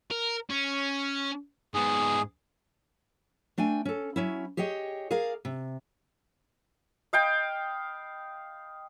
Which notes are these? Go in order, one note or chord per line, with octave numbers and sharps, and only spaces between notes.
A#4
C#4
G#2 B3 G#4
A3 D4 G5 G#5
C#4 A4
F#3 C#4 E4
G4 G#4 C#5 D#5 G5
G#4 A#4 D5 F5
C3
D#5 F5 G5 B5